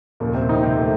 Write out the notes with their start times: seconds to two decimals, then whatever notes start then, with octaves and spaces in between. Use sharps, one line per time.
0.20 D#2 A#2 C#3 F3 A#3
0.35 C3 C4
0.49 D#3 D#4
0.63 C3 C4
0.77 A3